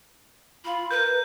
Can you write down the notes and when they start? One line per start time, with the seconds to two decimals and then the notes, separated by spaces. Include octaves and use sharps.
0.65 F4 B5
0.91 A#4 B4 G6